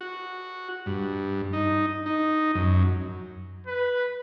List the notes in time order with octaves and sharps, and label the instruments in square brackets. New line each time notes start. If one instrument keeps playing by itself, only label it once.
[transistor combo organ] F#4
G2
D#4
D#4
F#2
[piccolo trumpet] B4